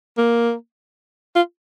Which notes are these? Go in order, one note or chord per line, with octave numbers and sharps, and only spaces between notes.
A#3
F4